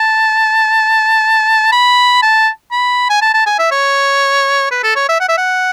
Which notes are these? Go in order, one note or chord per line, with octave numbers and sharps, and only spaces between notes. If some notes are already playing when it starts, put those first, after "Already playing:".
Already playing: A5
B5
A5
B5
G#5
A5
A5
G#5
E5
C#5
B4
A4
C#5
E5
F#5
E5
F#5